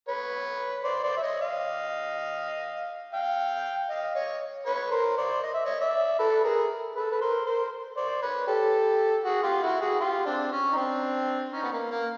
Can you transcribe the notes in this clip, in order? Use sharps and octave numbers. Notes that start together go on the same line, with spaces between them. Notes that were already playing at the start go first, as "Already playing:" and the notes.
B4 C#5
C5 D5
C5 D5
E5
C#5 D#5
D#5 F5
F5 G5
D#5 F5
C#5 D#5
B4 C#5
A#4 C5
C5 D5
D#5
E5
C#5 D#5
D5 E5
A4 B4
G#4 A#4
A4 B4
B4
A#4 C5
A#4 C5
C5 D5
B4 C#5
G4 A4
F#4 G#4
F4 G4
E4 F#4
F#4 G#4
F4 G4
C4 D4
C#4
D#4
C4 D4
C#4 D#4
B3
A#3
A#3